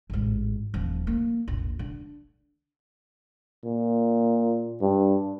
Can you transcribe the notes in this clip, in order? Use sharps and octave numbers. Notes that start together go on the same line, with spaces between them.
A1 G#2
D#1 F3
A#3
E1 A#1
D3
A#2
G2